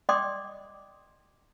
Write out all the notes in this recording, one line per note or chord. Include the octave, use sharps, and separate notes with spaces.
D5 D#5 G5 C6 D6 D#6